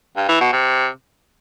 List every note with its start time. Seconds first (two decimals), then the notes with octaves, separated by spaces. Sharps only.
0.16 G2
0.28 E3
0.40 B2
0.52 C3